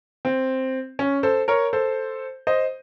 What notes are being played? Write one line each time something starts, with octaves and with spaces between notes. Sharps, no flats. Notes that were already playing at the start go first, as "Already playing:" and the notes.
C4
C#4
A4 C5
A#4 C#5
A4 C5
C5 D#5